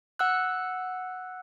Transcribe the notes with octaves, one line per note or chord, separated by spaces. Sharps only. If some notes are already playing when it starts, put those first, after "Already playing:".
F#5 E6 F#6